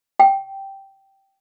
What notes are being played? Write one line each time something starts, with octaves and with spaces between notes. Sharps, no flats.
G5